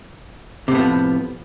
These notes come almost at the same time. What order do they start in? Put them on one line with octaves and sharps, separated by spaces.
C3 A2 B3 F3